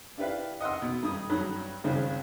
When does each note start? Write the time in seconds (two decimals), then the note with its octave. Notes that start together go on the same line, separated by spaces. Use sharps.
0.18 D4 E4 G4 B4 F5
0.61 D#5 F#5 C6 E6
0.82 B2
1.03 G2 D#6
1.30 G2 F#3 C#5
1.84 G#1 C#2 G2 C4 G#4